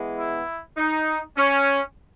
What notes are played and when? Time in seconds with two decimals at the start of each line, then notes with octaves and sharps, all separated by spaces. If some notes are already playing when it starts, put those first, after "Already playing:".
Already playing: E3 G#3 B3
0.18 E4
0.77 D#4
1.37 C#4